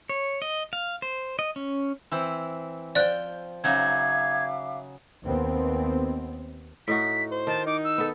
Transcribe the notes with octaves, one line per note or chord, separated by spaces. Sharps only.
C#5
D#5
F5
C5
D#5
C#4
E3 C4 E4
F3 D5 G5 F#6
C#3 F#3 D#4 E5 F5 D6 G#6
D#2 B3 C4
A2 D#4 F#4 B6
C5
D#3 A5
D#4 D6
E6
B3 A4